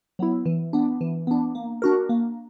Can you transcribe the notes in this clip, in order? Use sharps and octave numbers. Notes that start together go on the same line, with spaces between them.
F#3 B3 E4
E3
B3 D4
E3
B3 D4
A#3
D4 F#4 A#4
A#3